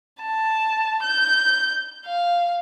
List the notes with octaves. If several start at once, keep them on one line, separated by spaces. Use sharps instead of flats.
A5
G6
F5